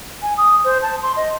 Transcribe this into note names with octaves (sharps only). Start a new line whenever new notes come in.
G#5
D#6
C5
A5
C6
D#5